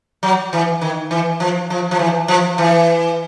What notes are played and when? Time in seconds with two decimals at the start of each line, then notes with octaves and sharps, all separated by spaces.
0.23 F#3
0.53 E3
0.81 D#3
1.11 E3
1.40 F3
1.70 F3
1.91 F3
1.99 E3
2.28 F3
2.58 E3